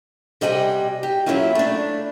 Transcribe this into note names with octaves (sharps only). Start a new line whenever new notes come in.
C3 G3 D#5 F#5 G#5
G4
F#3 G#3 A#3 C#4 E4 F4
A3 D4